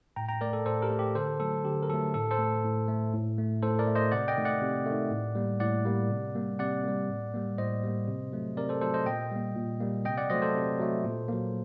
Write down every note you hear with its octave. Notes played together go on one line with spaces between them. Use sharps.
A2 G5 A#5
G5 A#5
A3 A#4 D5
A4
A2 A4 C5
G4 A#4
A3
G4
D3 A4 C5
F#3 A3 A4
D3 G4
A#4
F#3 A3 A4
A2 A4
A4 C5
A3
A2
A3
A2
A3
A2 A4 C5
A#4 D5
A3
C5 D#5
C3 D5 F#5
D#5 G5
D#3 A3
D5 F#5
C3
D#3 A3
A2
G3 A#3
A2 D5 F#5
G3 A#3
C3
G3 A#3
C3 D5 F#5
G3 A#3
A2
G3 A#3
A2 C5 D#5
G3 A#3
C3
F#3 A3
C3 A#4 D5
A4 C5
F#3 A3 A4 C5
C5 D#5
A#2 D#5 G5
G3 A#3
A#2
G3 A#3
C3 D#5 G5
D5 F#5
F#3 A3 C5 D#5
A4 C5
C3
F#3 A3
A#2
F#3 A#3